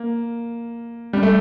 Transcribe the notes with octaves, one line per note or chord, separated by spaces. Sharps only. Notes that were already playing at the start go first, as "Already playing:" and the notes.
Already playing: A#3
G3
A3